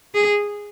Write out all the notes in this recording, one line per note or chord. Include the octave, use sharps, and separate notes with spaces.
G#4